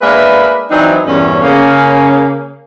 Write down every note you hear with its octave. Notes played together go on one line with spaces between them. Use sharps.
G#3 A#3 D4 A#4 B4 E5
E3 F#3 C4 D4 D#4
E2 G2 A#2 C#4
C#3 A#3 C#4